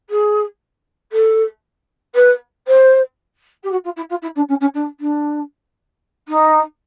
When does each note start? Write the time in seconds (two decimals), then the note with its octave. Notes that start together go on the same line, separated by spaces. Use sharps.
0.09 G#4
1.12 A4
2.15 B4
2.67 C5
3.63 G4
3.71 F#4
3.84 F4
3.96 E4
4.09 F4
4.22 E4
4.35 D4
4.48 C#4
4.60 C#4
4.74 D4
5.00 D4
6.28 D#4